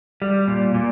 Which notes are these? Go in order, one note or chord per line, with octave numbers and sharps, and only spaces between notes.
G3
A#2
A#2